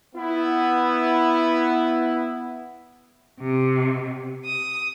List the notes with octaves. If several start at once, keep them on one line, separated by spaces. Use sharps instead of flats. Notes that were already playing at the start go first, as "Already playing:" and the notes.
B3 E4
C3
D#6